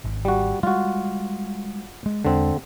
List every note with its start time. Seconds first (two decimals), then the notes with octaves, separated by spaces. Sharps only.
0.04 G#1
0.25 G3 F#4
0.63 G3 G#3 F4 F#4
2.06 G#3
2.25 E2 D3 G#3 C4 D4